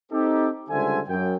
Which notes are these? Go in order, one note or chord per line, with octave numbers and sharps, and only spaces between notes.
C4 D#4 G4 A4
C#2 D3 G3 C5 E5 G#5
F#2 G5